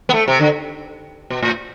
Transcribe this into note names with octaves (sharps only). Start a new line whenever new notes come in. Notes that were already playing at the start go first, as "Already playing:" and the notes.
B3
A3
C3
D3
B2
A2